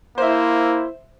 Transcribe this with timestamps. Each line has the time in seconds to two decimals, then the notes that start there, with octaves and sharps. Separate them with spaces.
0.18 A#3 E4 C5 E5